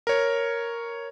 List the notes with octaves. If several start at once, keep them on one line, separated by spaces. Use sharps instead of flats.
A#4 C#5